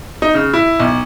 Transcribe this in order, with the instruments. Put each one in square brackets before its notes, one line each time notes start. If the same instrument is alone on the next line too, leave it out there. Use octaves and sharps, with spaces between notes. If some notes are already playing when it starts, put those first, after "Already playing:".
[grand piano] D#4
C#3
E4
B1